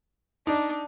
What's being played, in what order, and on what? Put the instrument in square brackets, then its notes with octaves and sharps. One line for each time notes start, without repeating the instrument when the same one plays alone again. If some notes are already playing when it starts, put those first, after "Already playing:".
[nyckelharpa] D4 [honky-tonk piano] D#4